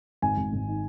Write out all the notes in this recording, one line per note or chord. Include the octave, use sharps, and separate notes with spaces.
G#1 G#5
G#1
G#1
D#3